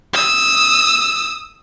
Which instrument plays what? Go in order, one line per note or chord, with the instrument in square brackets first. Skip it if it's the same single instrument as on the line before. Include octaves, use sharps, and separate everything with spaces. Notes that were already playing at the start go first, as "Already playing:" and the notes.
[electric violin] D#6 E6